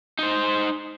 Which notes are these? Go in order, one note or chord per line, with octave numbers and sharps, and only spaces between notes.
D#4 C5